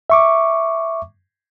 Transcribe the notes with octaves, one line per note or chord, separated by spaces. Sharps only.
E5 C#6 D6